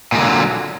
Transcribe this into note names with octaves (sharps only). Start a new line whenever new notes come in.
A#2 D3 F#3 G#3